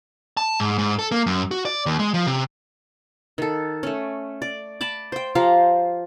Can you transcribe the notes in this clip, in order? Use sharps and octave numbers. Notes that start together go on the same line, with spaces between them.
A5
G#2
G#2
A4
A#3
F#2
F#4
D5
D#2
G#3
F3
C3
D#3 A4
A3 C#4
D5
A5 B5 D6
C5 G5
F3 G4 F5 A#5